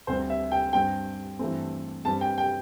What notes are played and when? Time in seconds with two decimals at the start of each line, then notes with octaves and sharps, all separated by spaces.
0.07 D2 D3 G3 C4 C5
0.30 E5
0.52 G5
0.73 G2 G3 C4 G5
1.39 G2 E3 A3 C4
2.05 G2 G3 C4 A5
2.21 G5
2.38 G5